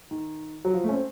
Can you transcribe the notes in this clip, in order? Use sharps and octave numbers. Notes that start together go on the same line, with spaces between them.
D#3
F#3
F3
A3
C#4
C4